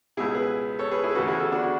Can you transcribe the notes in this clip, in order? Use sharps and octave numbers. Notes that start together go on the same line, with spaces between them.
C#2 B2 E4 G#4
G#4 B4
A4 C#5
G#4 B4
E4 G#4
B4
D2 C#3 E3 F#4 A4
E4 G#4
F#4 A4
D4 F#4
F#4